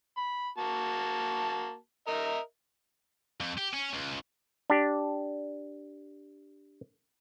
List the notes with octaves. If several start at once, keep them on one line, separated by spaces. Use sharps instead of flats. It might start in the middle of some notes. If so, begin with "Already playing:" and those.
B5
A#3 F#4 A5
A#4 D#5 E5
F2
G4
C#4
C#2
D4 G4